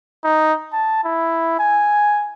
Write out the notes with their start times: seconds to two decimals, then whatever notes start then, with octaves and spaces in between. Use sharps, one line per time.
0.24 D#4
0.72 A5
1.04 E4
1.59 G#5